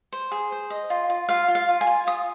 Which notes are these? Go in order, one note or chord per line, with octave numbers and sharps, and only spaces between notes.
C5
G#4
C5
D#5
F4
F4
F4 F5
F4
F5
F4
G#5
F4
F4 D#6